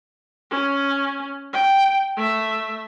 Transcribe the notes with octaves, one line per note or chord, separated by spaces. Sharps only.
C#4
G5
A3 E5